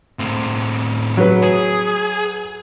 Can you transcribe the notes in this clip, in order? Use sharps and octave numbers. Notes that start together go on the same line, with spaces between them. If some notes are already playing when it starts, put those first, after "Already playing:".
A2 C4
F#3 B4
G#4